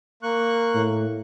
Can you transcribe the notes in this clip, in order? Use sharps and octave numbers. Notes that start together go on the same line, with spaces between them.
A#3 C#6 F#6
A2